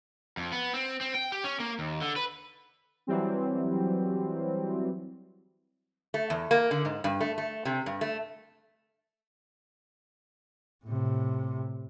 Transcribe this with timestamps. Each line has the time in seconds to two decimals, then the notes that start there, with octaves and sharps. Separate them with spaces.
0.37 F2
0.52 B3
0.74 C4
1.01 C4
1.15 G5
1.32 G4
1.44 C#4
1.60 A#3
1.79 D#2
2.01 D3
2.16 B4
3.07 E3 F#3 G3 C4
6.14 A3
6.30 E2
6.51 A#3
6.71 D3
6.85 G#2
7.04 G2
7.21 A3
7.38 A3
7.65 C3
7.86 G2
8.01 A3
10.85 A2 C3